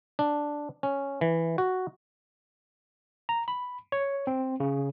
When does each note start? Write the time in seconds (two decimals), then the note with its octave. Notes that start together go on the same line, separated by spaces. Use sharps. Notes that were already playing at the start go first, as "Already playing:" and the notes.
0.19 D4
0.83 C#4
1.21 E3
1.58 F#4
3.29 A#5
3.48 B5
3.92 C#5
4.27 C4
4.60 C#3